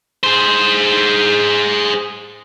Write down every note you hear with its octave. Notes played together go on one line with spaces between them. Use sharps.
G#4 C5